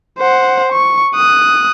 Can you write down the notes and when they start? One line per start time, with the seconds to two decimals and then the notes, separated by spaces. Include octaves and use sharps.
0.19 C5 F#5
0.72 C#6
1.16 D#6 F#6